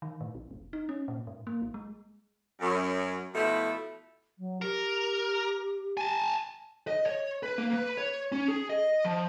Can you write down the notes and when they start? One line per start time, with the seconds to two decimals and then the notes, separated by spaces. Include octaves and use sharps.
0.02 D#3
0.21 A2
0.35 A#1
0.51 F1
0.73 D#4
0.89 C#4
1.08 A#2
1.27 G#2
1.47 A#3
1.62 A1
1.74 G#3
2.60 F#2
3.33 B2 F3 A3 E4
4.39 F#3
4.62 G4 A#4
5.97 G#5 A5
6.87 D#5
7.06 C#5
7.43 B4
7.58 A#3
7.73 B4
7.97 C#5
8.32 C#4
8.48 G#4
8.70 D#5
9.05 F3